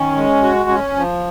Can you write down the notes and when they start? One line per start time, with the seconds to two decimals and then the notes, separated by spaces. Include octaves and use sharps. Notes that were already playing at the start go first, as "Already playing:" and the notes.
Already playing: D#3 C#4
0.16 G#3
0.42 F#4
0.69 C#4
0.96 F3